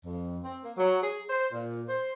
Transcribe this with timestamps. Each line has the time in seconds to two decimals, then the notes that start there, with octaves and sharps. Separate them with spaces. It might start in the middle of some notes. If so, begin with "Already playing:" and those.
0.05 F2
0.43 C4
0.64 A#3
0.77 F#3
1.02 G#4
1.29 C5
1.53 A#2
1.88 C5